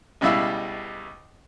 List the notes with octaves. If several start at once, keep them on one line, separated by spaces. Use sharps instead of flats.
C#2 B2 G3 E4 F5 E6